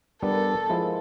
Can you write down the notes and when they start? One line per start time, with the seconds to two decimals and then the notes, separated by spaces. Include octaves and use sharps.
0.23 G3 B3 D4 A4 A#4
0.70 F3 G#3 E4